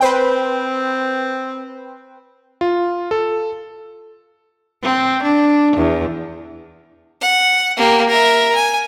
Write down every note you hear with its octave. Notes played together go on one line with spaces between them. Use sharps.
C4 B4 C5 G5
F4
A4
C4
D4
E2
F#5
A#3 G4
A#4 E5
G#5